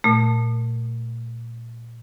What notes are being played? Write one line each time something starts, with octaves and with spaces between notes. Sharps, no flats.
A#2 A3